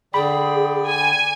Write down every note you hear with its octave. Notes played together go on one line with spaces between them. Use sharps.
D3 G#4 D5 G5 B5
G#5